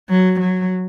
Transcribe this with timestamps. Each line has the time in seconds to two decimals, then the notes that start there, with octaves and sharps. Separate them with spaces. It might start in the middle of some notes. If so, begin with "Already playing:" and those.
0.10 F#3
0.40 F#3